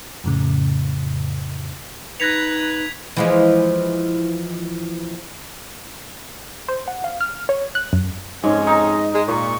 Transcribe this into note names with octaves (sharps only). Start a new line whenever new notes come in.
F2 A2 C#3
D#4 B4 F#6 G#6 A#6 B6 C#7 F7
E3 F3 G#3
C5
F#5
F5
F6
C#5
F#6
F#2
F2 G#2 G#3 C#4 C#5
D#4 D#5 A#5
G#3
A#2 C#6